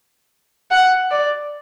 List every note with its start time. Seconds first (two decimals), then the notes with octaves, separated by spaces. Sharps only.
0.71 F#5
1.11 D5